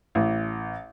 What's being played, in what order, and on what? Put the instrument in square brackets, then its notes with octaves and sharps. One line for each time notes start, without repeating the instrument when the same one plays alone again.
[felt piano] A1